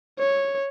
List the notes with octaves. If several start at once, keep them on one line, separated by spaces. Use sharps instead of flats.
C#5